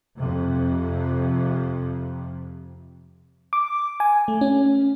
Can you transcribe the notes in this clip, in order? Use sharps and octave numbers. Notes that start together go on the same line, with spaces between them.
F2 C3
D6
G#5
A3
C#4